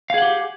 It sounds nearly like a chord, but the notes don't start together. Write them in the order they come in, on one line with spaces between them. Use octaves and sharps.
F5 G#4 F#5 G4